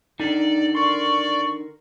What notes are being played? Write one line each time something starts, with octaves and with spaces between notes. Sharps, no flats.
D3 D#3 D#4 D5
A#4 D5 C6 C#6